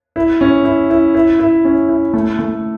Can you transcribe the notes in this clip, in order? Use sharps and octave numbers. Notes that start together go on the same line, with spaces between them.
E4
C#4
E4
E4
E4
E4
C#4
E4
A3
A3